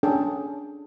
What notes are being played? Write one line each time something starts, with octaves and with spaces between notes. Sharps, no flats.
C#4 D4 G#4 A4 G5